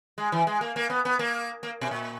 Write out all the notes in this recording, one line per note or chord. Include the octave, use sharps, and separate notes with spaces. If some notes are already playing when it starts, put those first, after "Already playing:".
G#3
E3
G#3
A#3
A#3
B3
B3
A#3
A#3
B2
A#2